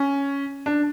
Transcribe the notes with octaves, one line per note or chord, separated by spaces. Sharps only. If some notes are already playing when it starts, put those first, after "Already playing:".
Already playing: C#4
D4